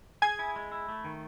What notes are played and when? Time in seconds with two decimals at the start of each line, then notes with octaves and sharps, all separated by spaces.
0.22 G#4 G#5 G#6
0.39 E4
0.56 G#3
0.72 E4
0.89 A3
1.05 D#3